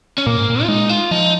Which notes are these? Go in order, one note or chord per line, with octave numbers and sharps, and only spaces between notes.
C#4
A#2 A#3
G#2
A#2
F4
G#3 D#4
F4
F3 D#4